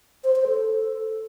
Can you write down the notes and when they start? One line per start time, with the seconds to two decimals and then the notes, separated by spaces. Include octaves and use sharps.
0.24 C5
0.36 C5
0.47 A4